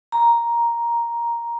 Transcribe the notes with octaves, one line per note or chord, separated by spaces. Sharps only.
A#5